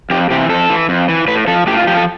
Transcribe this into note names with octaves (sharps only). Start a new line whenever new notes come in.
F2 G4
C3 E3 G4
F2 A4
E3
F2
E3
A2 B4
F3 A4
A2 G4
F4
F3 G4
A4